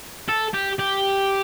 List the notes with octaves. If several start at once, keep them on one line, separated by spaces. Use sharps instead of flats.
A4
G4
G4